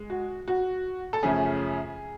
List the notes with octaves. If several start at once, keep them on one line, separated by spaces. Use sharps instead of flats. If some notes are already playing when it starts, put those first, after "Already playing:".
Already playing: G#3
F#4
F#4
A4
F#2 C#3 F3 A3 C#4 G#4